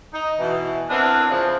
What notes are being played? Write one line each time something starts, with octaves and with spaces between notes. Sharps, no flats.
D#4
B2 E3
B3 C4 D4 E4 A#4 B4
C#3 F3